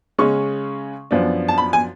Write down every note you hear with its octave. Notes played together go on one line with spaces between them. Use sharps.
C#3 G#3 C#4 C#6
F#2 F3 B3 D4
A5
B5
G#5